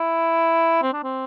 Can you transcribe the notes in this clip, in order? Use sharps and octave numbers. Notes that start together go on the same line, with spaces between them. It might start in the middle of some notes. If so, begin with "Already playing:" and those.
Already playing: E4
C4
D4
C4